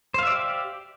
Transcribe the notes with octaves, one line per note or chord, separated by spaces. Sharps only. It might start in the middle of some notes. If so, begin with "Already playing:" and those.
G4 C5 D5 E5 F5